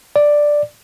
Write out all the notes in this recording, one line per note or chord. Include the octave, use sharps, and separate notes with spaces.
D5